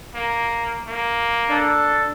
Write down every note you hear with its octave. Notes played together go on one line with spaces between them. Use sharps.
A#3
A#3
D4 A4